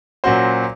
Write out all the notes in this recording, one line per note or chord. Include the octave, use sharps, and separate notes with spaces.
A#2 F#3 C#4 F#4 C5